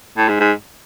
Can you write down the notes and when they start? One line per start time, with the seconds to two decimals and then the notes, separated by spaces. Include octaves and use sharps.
0.18 A2
0.29 G#2
0.40 G#2